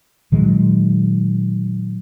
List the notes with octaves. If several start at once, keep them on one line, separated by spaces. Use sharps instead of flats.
A#2 D#3 F#3 G#3